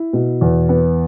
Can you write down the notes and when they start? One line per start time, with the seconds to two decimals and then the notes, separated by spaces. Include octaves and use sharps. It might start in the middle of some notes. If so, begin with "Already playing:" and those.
Already playing: E4
0.13 B2
0.41 E2
0.69 B3